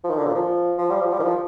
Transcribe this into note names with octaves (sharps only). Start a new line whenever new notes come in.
F3
D#3
D3
A#2
F3
F3
G3
F3
G3
D#3
F3